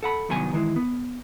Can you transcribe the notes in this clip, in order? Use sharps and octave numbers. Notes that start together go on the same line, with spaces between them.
A4 F#5 B5
C2 D#3 F#3 B3 G#5
D#3 E3 G#3
B3